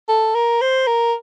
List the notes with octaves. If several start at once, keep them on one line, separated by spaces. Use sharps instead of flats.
A4
A#4
C5
A#4